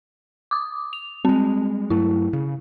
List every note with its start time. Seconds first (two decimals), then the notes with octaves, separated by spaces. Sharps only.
0.51 D6 D#6
0.93 F7
1.25 G3 G#3 C4
1.90 G2 F#3 A3 E4
2.33 C#3